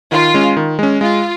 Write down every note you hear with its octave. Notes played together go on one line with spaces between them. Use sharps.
D#3 F4
G#3 C#4
D#3
G#3 C#4
G#3 F4